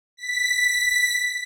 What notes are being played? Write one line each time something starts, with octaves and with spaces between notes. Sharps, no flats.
B6